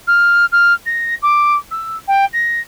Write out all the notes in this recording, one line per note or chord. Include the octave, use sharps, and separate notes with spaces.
F6
F6
A#6
D6
E6
G5
A#6